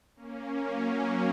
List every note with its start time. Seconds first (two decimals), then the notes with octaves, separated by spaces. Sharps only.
0.16 A#3 C#4
0.66 F#3 A#3